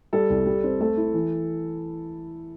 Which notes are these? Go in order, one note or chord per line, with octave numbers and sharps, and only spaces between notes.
G3 A4
C2
G3
C4
A3 A4
E4
E3